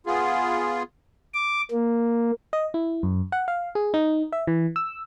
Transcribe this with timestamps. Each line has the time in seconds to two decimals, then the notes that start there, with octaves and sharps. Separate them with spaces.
0.07 B3 F4 G#4
1.34 D6
1.71 A#3
2.53 D#5
2.74 E4
3.03 F#2
3.32 F#5
3.48 F5
3.75 G#4
3.94 D#4
4.32 E5
4.47 E3
4.76 E6